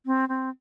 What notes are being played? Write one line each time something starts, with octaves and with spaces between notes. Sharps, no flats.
C4
C4